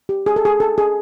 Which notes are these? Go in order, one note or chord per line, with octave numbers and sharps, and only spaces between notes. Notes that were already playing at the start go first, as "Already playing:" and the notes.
G4
G#4
A4
G#4
A4
G#4